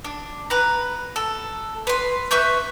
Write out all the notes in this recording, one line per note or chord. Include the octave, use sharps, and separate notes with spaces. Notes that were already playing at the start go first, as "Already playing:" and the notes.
D4
B4 A#5
A4
B4 C6
B4 E5 C#6 G6